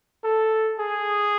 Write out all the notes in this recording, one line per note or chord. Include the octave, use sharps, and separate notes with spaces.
A4
G#4